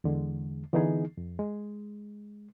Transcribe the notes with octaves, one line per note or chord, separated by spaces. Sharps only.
E2 D3 G#3
D3 E3 B3 D#4 G#4
F2
G#3